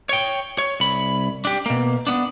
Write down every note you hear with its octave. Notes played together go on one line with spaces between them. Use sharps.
C#5 G5
C#5
C2 B5
D4 G4
B2 A#3
B3 D4